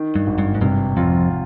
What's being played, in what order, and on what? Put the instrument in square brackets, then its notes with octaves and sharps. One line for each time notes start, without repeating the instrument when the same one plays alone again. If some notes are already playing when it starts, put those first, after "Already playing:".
Already playing: [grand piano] D#3
[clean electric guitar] G2
[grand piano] G#1
[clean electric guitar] G2
G#2
[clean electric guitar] G2 [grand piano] C3
[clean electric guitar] F2 [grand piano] F4